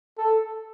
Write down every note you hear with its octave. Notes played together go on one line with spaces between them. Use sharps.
A4